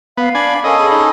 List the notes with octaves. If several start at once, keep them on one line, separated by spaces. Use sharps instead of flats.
B3 F5
D4 G#5 B5
C#4 A4 A#4 D#5 F5 G#5
G#4 B5
D#4